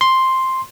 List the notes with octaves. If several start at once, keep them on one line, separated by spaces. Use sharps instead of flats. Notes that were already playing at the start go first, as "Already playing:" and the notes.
C6